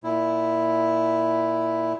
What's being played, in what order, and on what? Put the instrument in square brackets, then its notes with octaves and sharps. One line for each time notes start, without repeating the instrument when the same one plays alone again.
[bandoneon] A#2 E4